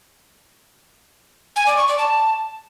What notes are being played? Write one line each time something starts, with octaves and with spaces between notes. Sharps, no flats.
G#5
D5
C#6
D5
A5